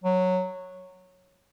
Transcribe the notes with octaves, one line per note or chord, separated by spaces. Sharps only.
F#3